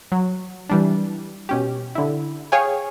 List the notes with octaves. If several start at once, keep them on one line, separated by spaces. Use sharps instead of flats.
F#3
E3 G3 D4
B2 C#4 G4
D3 E4
G#4 C#5 F5 G5 G#5